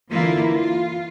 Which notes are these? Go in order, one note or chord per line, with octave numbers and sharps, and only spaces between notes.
D3 E3 A#3 E4 F4
F4